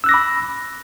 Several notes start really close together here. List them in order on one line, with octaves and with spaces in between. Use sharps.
E6 F#6 A#6 D6 B5